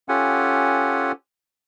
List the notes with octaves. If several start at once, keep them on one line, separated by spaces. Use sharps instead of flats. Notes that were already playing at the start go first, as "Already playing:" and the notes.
C#4 F4 G4 A4 F#5 G#5